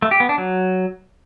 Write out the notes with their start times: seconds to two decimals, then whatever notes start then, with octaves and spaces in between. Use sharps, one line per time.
0.02 A3
0.11 G4
0.20 B3
0.29 D4
0.38 F#3